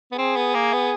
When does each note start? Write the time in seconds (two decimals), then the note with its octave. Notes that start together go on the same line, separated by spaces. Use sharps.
0.12 B3
0.18 C4 G#4
0.36 B3
0.55 A#3
0.73 B3